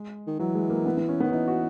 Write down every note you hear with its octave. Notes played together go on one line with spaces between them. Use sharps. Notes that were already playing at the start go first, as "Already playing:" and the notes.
Already playing: G#3
D#3
E3 F#3
G#3
A#3
B3
B3
C#4
D#3 B3
E3 D#4
F#4